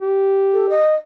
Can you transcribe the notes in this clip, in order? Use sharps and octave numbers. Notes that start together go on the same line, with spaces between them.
G4
A4
D#5